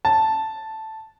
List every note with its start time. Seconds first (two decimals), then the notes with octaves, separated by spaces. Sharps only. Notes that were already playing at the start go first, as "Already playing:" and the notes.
0.05 A5